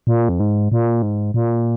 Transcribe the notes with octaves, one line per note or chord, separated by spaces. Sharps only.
A#2
F2
G#2
A#2
G#2
A#2